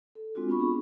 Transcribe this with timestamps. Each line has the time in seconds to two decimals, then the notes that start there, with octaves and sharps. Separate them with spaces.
0.15 A4
0.35 G#3 C4 D4 F4 F#4
0.48 B3 D4 F4 B5 C#6
0.60 D4 G#4